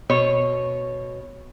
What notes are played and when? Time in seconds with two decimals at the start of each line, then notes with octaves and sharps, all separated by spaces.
0.10 B2 C#5